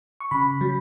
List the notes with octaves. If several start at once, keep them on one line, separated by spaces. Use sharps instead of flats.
C#6
C#3 B5
F#3